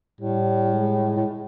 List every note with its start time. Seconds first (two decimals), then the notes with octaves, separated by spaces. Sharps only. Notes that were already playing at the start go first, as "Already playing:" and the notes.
0.21 A2 G3
0.73 G#3
1.17 A2